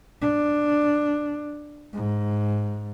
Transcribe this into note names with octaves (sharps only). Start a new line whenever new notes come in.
D4
G#2